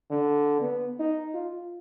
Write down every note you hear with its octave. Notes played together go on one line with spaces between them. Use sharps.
D3
B3
D#4
F4